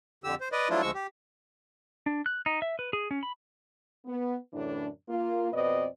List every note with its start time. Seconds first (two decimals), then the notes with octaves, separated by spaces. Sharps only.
0.24 F2 D3 G4 E6
0.41 C5
0.52 B4 D5 D#5
0.70 F3 F#3 A3 D4 E4 F4
0.82 D2 F3 G#3 C#6 E6
0.94 G4
2.06 D4
2.26 F#6
2.46 D#4
2.62 E5
2.79 B4
2.93 G#4
3.11 C#4
3.23 B5
4.06 B3
4.53 F#2 A2 D3 E3 D4
5.09 A#3 F4
5.52 F2 B2 C4 B4 D5 D#5